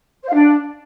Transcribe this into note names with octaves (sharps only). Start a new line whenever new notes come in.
C5
F5
D4